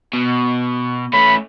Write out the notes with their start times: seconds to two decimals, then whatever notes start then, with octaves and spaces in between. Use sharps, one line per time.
0.13 B2
1.13 A3 C#4 B5